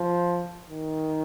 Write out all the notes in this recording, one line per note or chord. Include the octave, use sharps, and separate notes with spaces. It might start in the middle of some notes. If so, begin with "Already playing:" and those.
Already playing: F3
D#3